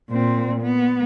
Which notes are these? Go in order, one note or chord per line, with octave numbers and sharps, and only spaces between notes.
A#2 C4
B3